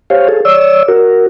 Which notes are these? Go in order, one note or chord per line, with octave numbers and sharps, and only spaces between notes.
G4 C5 C#5 F5
G#4 A4
C#5 D5 E6
F#4 A#4